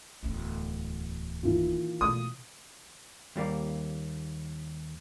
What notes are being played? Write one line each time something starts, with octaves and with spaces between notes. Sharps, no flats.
D1 E2
A#2 D#3 E3
B2 A3 D#6
D#2 G3 A#3